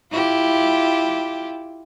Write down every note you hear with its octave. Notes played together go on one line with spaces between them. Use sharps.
E4 F4 G4